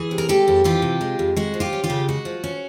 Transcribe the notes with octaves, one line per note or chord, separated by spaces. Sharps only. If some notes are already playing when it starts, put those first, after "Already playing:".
Already playing: E3 G#4
C3
A#4
G#3 G4 A4
F2
E3 F4 G4
C3
G#3
F2
G#3 F#4
F3
F4 G4
C#4
F4 G4
C#3
G#3 F#4
F3
C#4